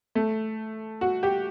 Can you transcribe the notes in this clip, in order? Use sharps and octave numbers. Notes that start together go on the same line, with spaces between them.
A3
F#4
G4